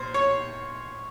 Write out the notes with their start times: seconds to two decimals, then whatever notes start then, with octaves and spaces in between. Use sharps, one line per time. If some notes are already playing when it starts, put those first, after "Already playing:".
Already playing: A#2 C5
0.14 C#5